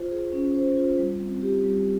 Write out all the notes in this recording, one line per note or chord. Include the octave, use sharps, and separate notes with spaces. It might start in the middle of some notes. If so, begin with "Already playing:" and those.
Already playing: F4 C5
G#4
C#4
C5
F4
G3
C4
G4
G3